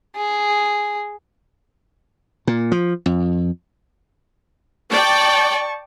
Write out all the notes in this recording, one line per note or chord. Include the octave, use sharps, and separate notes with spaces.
G#4
A#2
F3
F2
D5 G5 A5 C#6